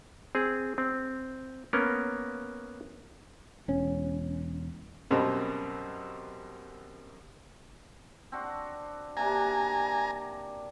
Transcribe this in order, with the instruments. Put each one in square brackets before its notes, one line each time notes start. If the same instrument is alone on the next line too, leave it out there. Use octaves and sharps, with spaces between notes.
[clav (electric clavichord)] C4 G#4
C4
A#3 B3 C#4 A#4
[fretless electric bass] E1 C#4
[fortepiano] F#2 B2 G3 C4
[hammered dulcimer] C4 D4 F#4
[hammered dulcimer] C3 A#3 D4 [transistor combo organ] G#5 A#5